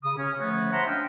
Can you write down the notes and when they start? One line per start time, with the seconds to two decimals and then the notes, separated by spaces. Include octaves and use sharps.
0.03 C#3 D#6
0.17 C#4
0.38 D3 F3 A3 B3 F#4 C#5
0.71 C5 E5 F#5 A5 A#5 C6
0.86 C#4 D4 D#5 F5 G5